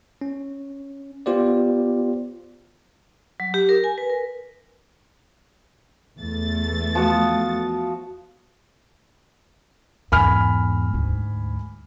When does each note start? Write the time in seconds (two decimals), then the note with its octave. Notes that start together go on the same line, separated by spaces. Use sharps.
0.21 C#4
1.26 B3 F4 G4 C5 D5
3.40 F#3
3.54 G4
3.69 A#4
3.84 G#5
3.98 B4
4.10 A#4
6.19 E2 A3 A6
6.95 F3 F#4 D#6
10.12 E2 G#2 G#5 B5 F6
10.94 D2 G#2